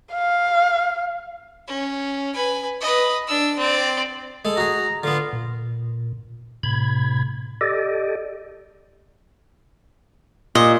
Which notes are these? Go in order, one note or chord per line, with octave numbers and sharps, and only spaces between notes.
F5
C#4
B4 G#5
B4 D#5
D4 E6
C4 D5
G#3 A4
F#4 G#4 A#5
D3 B3 F4
A#2
A2 C3 B5 G#6
G4 A4 D5 D#5
A#2 D#5